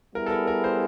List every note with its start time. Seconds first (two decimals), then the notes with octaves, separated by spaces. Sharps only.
0.15 G3 B3 E4 G#4 A#4
0.26 A4
0.31 A#4
0.47 A#4
0.64 C5